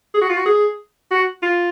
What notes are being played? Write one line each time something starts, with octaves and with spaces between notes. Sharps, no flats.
G#4
F#4
F4
F#4
G#4
F#4
F4